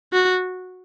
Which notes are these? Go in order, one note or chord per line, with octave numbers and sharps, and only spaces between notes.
F#4